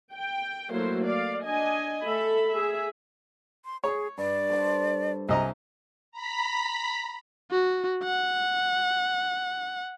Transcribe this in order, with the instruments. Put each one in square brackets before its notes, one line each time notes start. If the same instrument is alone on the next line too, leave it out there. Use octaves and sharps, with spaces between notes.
[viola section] G5
F#3 A3 A#3 E4 C5
D5 F5
D4 D#5 G#5
A3 A4 E5 B5
G#4 E5
[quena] C6
[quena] G#4 [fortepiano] C#5
[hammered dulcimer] G2 [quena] D5
[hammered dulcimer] A4 C5 A5
[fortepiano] C2 D#5 A#5 [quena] G#5
[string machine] A#5 B5 B6
[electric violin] F#4
F#5